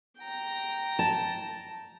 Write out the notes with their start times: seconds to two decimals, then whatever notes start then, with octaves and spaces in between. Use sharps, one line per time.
0.19 G5 A#5
0.99 A5